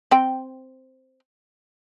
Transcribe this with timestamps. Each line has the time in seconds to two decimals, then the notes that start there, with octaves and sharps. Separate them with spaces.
0.11 C4 G5